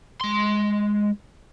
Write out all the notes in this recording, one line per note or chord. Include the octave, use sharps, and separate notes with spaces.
G#3 C6